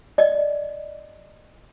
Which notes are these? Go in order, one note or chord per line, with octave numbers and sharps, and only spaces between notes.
D5 D#5